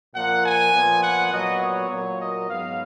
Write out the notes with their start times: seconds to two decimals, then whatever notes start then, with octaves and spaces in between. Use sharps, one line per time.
0.14 A#2 F3 A#3 F#5
0.43 G#5
0.72 A#2 F3 B3
1.01 F#5
1.31 A#2 F#3 B3 D#5
1.60 C#5
1.89 A#2 F#3 A#3
2.19 D#5
2.47 G#2 F#3 B3 F5